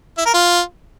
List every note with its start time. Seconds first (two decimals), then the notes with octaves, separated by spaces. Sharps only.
0.18 E4
0.26 A#4
0.34 F4